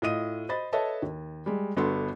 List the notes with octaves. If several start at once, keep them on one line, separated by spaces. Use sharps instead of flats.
A2 F4 D#5 D#6 D#7
C5 D#5 B5 A6
A4 B4 C#5 D#5 E5 A5
D#2
G3 G#3
G1 B3 F#4 A4 C6